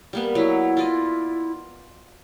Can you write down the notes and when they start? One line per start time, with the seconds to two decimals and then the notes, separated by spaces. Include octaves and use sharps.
0.13 G3 A#3 B3
0.35 F#3 E4
0.77 F4 D5 D#5